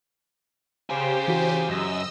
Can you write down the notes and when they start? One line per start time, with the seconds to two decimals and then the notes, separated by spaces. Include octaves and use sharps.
0.90 C#3 G4 C5 F5 G#5
1.28 E3 F#4 B6
1.69 F#2 D#5 E6